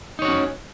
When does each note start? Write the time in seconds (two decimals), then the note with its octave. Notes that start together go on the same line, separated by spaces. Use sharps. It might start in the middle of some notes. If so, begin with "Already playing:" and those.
0.19 D#4
0.22 C#5
0.25 F#4
0.28 C#4